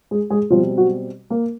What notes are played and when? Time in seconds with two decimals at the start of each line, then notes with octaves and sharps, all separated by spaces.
0.11 G#3 G#4
0.30 G#3 G#4
0.50 B2 F3 G3 C4 F4
0.78 F#3 F#4
1.30 A#3 A#4